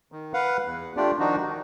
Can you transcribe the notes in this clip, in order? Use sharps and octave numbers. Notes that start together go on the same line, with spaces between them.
D#3
B4 F5 F#5
E2
A3 D4 F4 G4 D5
D#3 F3 D4 D#4 F#4
D#3